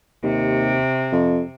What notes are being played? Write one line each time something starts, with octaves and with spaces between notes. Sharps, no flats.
D#2 C3
F2